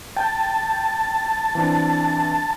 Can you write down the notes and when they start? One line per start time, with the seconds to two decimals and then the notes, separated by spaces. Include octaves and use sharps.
0.16 G5 A5 G6
1.55 E3 C4 D4